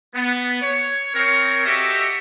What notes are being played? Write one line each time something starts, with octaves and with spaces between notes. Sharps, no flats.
B3
C#5
C4 A#4 C#5
F#4 G4 A4 D#5 E5 C#6